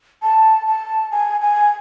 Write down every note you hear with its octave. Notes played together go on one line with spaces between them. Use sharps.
A5
A5
G#5
G#5